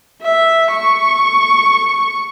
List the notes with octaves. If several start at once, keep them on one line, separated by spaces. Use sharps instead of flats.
E5
C#6